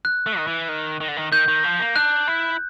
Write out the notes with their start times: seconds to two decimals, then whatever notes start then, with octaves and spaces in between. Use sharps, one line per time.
0.05 F#6
0.26 A3
0.37 D#3
0.47 E3
0.69 D#3
1.00 D#3
1.08 D3
1.16 D#3
1.32 D#3 G6
1.48 D#3
1.64 F3
1.80 A#3
1.96 D4 F#6
2.27 E4